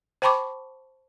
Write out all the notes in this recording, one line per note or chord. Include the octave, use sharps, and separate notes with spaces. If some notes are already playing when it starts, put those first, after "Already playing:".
C5 G5 A5 B5 C#6 D6